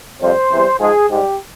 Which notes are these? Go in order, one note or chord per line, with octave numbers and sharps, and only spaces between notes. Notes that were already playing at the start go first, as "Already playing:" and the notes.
F2 C3 G3 C5
E2 C3 E3 G3
G#2 F3 G#3 G#4
G#2 G3 G4